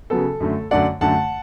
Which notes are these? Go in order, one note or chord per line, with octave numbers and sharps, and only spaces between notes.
C#3 F#3 B3 A4
F#2 D3 A3
F#2 D3 A3 D5 F#5
F#2 D3 A3 F#5 A5